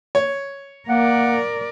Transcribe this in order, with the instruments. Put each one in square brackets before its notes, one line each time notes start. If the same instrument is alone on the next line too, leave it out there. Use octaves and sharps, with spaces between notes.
[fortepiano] C#5
[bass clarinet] A#3 [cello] A#4 D5 [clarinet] F#5